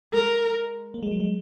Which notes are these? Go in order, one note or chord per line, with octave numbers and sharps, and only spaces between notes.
G#3 A#4
A#3
G#3
F#3
G#3